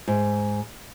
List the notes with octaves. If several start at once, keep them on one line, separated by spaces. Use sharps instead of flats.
G#2